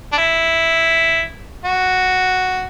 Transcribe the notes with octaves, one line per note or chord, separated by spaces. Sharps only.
D4
E4
F#4